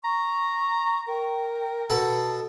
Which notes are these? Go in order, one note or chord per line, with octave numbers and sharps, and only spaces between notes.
A#5 C#6
A#4 G5
B2 A4 F#5 A5